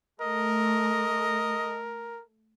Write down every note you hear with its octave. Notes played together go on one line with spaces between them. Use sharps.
A3 A#4 D#5